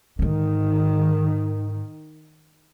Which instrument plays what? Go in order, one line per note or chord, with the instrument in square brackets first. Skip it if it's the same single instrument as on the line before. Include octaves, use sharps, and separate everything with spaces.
[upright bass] G#2 D3 [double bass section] D#3